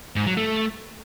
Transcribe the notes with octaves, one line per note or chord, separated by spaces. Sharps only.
G#2
F#3
A3